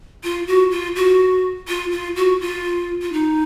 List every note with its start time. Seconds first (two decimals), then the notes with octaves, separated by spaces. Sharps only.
0.24 F4
0.47 F#4
0.71 F4
0.96 F#4
1.68 F4
1.92 F4
2.16 F#4
2.40 F4
3.02 F4
3.12 D#4